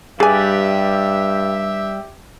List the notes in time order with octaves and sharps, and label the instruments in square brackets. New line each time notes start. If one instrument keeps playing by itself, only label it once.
[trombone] G2 [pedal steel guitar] G3 B4 D5 [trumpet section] G4 E5 [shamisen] G#4 G#5